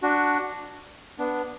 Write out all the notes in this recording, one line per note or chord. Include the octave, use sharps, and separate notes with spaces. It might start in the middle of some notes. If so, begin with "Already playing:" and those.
D4 F#4
B3 D4